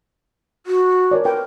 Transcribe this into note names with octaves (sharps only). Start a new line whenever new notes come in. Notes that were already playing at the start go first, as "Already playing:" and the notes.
F#4
A#4 C#5 D5
A#4 B4 G5